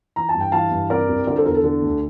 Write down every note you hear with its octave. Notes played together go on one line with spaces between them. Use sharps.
E3 A#5
A5
G2
G5
E3 F5 A5
G2
C3 A#4 D5
C2
D3 A#4 D5
A4 C5
E2 A#4
A4
D3
D2